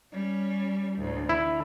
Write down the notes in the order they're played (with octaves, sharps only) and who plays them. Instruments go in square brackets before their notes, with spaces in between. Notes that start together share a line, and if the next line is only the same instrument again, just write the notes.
[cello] G3 C#4
D2 A2
[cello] D3 [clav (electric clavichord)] E4